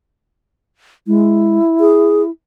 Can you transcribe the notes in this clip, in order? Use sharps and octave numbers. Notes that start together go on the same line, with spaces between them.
G#3 E4
G#4